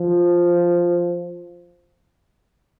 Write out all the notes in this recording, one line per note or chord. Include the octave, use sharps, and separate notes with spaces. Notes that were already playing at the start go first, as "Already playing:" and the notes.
Already playing: F3